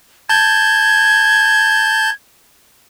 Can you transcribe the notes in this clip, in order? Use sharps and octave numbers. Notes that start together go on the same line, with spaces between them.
A5 G6 G#6